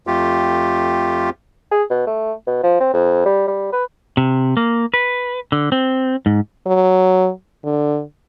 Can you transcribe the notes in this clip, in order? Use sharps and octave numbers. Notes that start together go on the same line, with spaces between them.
F2 A3 F4 G4
G#4
B2
A3
B2
F3
C4
F2
G3
G3
B4
C3
A#3
B4
D3
C4
G#2
F#3
D3